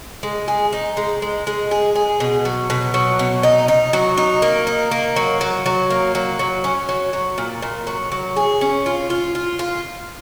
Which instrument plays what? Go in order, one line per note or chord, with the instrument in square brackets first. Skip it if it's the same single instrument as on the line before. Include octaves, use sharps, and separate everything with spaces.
[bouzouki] G#3
G#4
D#4
G#3
G#3
G#3
G#4
G#4
B2
F#3
B2
F#3
B2
D#4
D#4
F#3
D#4
A#3
D#4
A#3
F#3
F#3
F#3
A#3
F#3
F#3
C#4
F#3
F#3
A#2
A#2
F#3
F#3
G#4
C#4
F4
F4
F4
F4